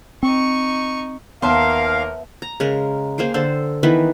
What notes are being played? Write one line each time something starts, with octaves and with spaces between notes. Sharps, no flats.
C4 D#4 C#6
D#2 A#3 B3 A#4 E5 F5 A5 C6
A#5
C#3 G#3 A#4
A#3 G#4 C5 G5
D3 A4 C5
D#3 E3 B3 B4